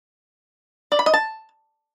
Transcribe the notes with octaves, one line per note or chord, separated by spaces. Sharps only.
D5
B5
D#5
A5